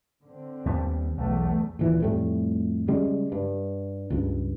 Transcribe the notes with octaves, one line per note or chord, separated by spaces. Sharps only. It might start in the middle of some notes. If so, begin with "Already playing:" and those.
D3 C4
D#2 G3 B3
B1 E2 A3
D#1 A#2 E3
F2 A2 G3 A3
C#3 G3 G#3
G2
C#2 G2